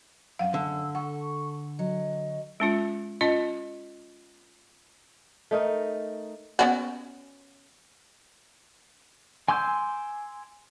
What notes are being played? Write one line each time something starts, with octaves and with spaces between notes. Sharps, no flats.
F#2 C#4 F5 F#5
D3 E6
A4 F#5 C#6
F#3 D#5
G#3 C#4 F4
C#4 F4 D#5
A3 D#4 A#4 D#5
B3 C#4 F#4
G#5 C6 D6 E6 G6